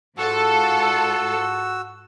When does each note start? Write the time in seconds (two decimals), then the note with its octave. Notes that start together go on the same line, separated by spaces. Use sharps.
0.18 G#2 F4 F#4 A4 E6